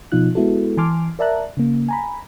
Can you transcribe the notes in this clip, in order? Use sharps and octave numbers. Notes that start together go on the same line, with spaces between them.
B2 F3 D#4 F4 F#6
G#3 B3 E4 F#4 A4
E3 G#5 A5 C6 D6 F6
A#4 D5 E5 A5 A#5 F#6
C#3 A#3
G#5 A#5 B5